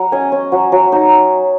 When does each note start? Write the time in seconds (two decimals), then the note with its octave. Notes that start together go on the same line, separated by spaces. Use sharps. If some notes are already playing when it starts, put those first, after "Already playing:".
Already playing: F#3 F#5 A#5
0.12 C#4 D#5 G#5
0.32 C#4
0.52 F#3
0.72 F#3
0.92 D#4